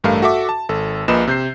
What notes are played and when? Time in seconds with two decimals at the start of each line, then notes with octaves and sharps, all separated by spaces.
0.04 A1 G2 A3 A#4 F5
0.22 F#4 A4 E5 D6
0.49 A5
0.69 G#1 A4
1.08 A#1 A#2 B4 D#5 E7
1.27 C3 G6 C7